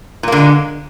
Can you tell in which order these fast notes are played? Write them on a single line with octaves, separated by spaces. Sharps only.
A#2 A#3 D3 G#3